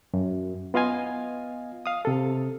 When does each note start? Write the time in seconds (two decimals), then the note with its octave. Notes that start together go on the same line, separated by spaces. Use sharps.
0.14 F#2
0.74 B3 F4 D#5 F5 G#5
1.86 F5 D#6
2.05 C3 A4